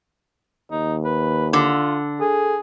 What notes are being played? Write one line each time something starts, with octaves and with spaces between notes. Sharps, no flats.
D#2 D#4
B4
D3 F4
G#4 A4